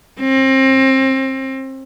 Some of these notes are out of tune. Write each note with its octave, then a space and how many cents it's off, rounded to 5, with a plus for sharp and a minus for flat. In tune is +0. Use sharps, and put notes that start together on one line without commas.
C4 +30